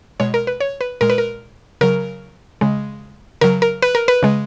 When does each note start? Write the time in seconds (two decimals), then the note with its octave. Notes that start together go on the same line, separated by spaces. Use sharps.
0.20 B2 G#3 C#5
0.34 A#4
0.47 B4
0.60 C#5
0.81 B4
1.01 A#2 G#3 A#4
1.10 B4
1.18 A#4
1.81 C#3 F#3 A#4
2.61 C#3 G#3
3.41 C#3 F#3 A#4
3.62 A#4
3.82 B4
3.95 A#4
4.08 B4
4.23 C#3 G#3